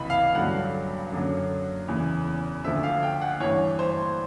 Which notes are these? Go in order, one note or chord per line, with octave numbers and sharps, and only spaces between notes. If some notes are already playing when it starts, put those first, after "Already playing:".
Already playing: C#2 C3 E3 B5
F5
G2 D3 F#3 F#5
F#2 D3 F#3
E2 C#3 E3
D2 D3 F3 E5
F5
G5
F#5
G2 E3 C#5
C5